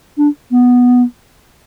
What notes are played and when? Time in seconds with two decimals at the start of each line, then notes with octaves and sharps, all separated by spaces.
0.18 D4
0.52 B3